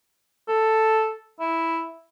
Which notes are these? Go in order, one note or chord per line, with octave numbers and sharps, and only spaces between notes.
A4
E4